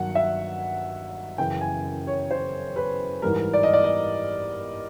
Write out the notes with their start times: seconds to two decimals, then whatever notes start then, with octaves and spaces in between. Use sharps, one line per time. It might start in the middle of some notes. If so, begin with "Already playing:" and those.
Already playing: G2 D#3 F#3 F#5
0.15 E5
1.38 F#2 C#3 E3 G5
1.61 G#5
2.07 C#5
2.31 C5
2.76 B4
3.22 G#2 E3 G3 A#4
3.54 D5
3.63 D#5
3.73 D5
3.84 D#5